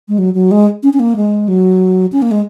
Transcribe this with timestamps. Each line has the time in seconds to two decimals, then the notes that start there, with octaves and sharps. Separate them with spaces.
0.09 G#3
0.18 F#3
0.34 F#3
0.51 G#3
0.83 C#4
0.93 C#4
1.00 A#3
1.16 G#3
1.48 F#3
2.12 C#4
2.22 A#3
2.31 G#3